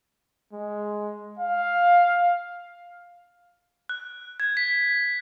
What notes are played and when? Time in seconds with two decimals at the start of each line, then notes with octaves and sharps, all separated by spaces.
0.53 G#3
1.39 F5
3.89 F#6
4.40 G#6
4.57 B6